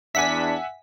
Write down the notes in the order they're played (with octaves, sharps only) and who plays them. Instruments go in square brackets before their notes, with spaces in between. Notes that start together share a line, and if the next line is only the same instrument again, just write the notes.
[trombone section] E2 D4 [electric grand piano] E5 F#5 G#5 [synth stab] B6